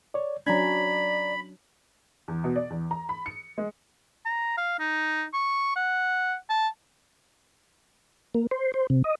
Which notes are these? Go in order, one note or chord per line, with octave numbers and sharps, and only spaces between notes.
C#5 D5
F#3 C#4 D4 D5 A#5 B5 G#6
E2
B2
D5
E2
A#5
B5
C#7
G#3
A#5
F5
D#4
C#6
F#5
A5
A#3
C5
C5
C3
D#5